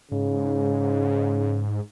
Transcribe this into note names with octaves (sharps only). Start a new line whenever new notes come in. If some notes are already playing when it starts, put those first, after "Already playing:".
G#2 C#3